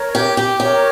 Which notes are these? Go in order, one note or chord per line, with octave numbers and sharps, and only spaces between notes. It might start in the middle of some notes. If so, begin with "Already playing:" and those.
Already playing: A#4 C#5
G4
G4
G4 A#4 C#5